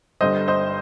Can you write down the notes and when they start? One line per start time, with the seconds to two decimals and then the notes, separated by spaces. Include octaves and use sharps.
0.21 G1 G2 D3 C5 D#5
0.48 C5 D#5